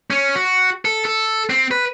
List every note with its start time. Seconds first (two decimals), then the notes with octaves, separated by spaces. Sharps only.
0.10 C#4
0.35 F#4
0.85 A4
1.05 A4
1.50 C4
1.71 B4